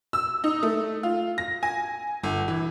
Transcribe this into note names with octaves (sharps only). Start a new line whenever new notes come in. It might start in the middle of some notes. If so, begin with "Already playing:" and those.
E6
D#4
A3
F4
A#6
G#5
G1
E3